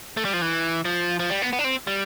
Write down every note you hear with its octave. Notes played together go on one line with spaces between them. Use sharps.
A3
G3
F3
E3
F3
F3
G3
B3
B3
D4
C4
G3